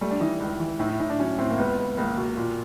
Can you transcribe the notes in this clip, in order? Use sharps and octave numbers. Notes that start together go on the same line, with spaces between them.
G3 A3
D4
E3 D#4
C#2
E3
A2 D#4
E4
A2 D#4
D4
F#3 C#4
A2 C4
A#3
C#2 B3
C#2
C#2 A#3
B2
A#2